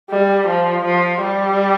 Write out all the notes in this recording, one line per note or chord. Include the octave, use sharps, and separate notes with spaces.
G3
F3
F3
G3